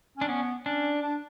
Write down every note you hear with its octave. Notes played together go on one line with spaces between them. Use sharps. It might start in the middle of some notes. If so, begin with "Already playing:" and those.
C#4 D4
B3 C#4
C#4 D4
D4